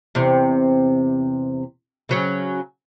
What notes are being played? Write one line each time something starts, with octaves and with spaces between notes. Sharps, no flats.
E2 C3
C#3 F#3 C#4